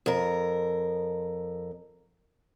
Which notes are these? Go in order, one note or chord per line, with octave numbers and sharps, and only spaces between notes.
F2 A#4